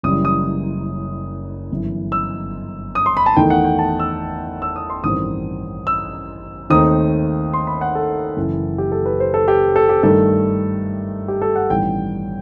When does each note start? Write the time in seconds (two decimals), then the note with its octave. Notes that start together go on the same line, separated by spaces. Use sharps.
0.03 F#1 F#2 E3 G3 D#6
0.25 D#6
1.71 G1 F#2 E3
2.12 E6
2.95 D#6
3.06 C6
3.17 B5
3.26 A5
3.36 E2 D#3 A3 D#4 G5
3.50 F#5
3.64 G5
3.79 A5
3.99 E6
4.62 E6
4.76 D#6
4.90 C6
5.03 A1 G2 D#3 G3 C4 D#6
5.87 E6
6.70 D#2 D#3 A3 C4 D#4 D#6
7.53 C6
7.67 B5
7.81 F#5
7.95 A4
8.37 F#1 F#2 E3
8.78 G4
8.92 A4
9.06 B4
9.20 C5
9.34 A4
9.48 G4
9.76 A4
9.89 G4
10.03 G2 D#3 A3 D#4 A4
11.28 G4
11.42 A4
11.56 F#5
11.70 A1 G2 D#3 G3 B3 G5